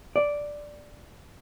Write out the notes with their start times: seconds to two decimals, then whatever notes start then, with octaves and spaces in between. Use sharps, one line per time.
0.16 D5